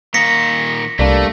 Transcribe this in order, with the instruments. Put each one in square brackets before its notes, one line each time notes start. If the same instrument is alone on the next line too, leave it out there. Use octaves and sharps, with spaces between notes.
[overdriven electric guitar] A#2 D#3 [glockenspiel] A#6 B6 C#7
[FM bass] C2 [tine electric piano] G3 A#3 D4 [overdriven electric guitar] A3